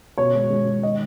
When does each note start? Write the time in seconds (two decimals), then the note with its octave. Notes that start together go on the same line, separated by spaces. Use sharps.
0.18 B2 C#5
0.35 G#3
0.50 G#3
0.66 G#3
0.83 D#3 D#5